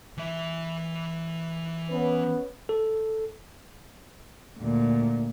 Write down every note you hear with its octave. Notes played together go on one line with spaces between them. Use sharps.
E3 E5
B3 C#4 B4
A4
D2 A#2